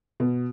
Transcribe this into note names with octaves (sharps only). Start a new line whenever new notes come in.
B2